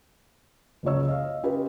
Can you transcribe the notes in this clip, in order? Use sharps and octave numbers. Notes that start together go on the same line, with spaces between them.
F#1 C#2 F4 C#5 E6
D#5 F5
C#4 F4 G4 A#4 B4 D#5